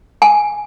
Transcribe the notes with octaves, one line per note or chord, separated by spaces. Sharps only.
G#5